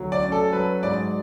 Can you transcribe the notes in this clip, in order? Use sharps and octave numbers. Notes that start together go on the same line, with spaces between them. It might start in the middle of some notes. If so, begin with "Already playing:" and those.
Already playing: D2 F#3
D5
C#4
A4
F#3 B4
G#2 D5